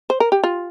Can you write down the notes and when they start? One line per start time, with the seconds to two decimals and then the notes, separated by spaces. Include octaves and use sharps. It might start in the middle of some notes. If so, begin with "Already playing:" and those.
0.10 C5
0.20 A#4
0.32 G4
0.44 F4